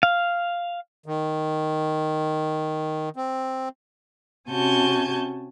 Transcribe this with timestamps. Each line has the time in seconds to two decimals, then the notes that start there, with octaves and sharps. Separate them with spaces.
0.03 F5
1.06 D#3
3.16 C4
4.48 C3 C#4 F#4 G#5 A5 G6